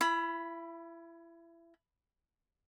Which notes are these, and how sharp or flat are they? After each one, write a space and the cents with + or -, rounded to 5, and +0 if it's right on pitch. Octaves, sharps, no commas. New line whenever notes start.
E4 +30 B5 +0